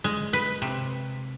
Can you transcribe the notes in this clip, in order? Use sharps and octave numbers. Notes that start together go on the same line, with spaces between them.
G#3
B4
C3